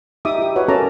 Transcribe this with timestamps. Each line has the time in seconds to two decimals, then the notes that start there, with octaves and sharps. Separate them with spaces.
0.25 D#4 G4 E5 D6 D#6
0.38 E4 G4
0.56 F#4 B4 C#5 F#5
0.68 C#4 A4 A#4 A5 A#5 D6